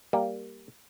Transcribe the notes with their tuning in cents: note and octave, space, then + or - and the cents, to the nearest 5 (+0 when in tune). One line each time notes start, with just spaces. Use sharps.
G3 +0 A#3 +0